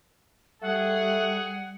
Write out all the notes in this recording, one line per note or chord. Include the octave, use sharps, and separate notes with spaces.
G3 A3 G#4 F#5